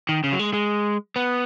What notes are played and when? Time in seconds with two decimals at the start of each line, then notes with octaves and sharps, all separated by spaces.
0.09 D#3
0.24 C#3
0.32 F#3
0.39 G#3
0.53 G#3
1.16 B3